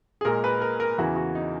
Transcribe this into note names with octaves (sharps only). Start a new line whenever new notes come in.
G#4
A#2 G#3 A#4
B4
A#4
A#4
E2 C#3 E3 F#4
F#4
D#4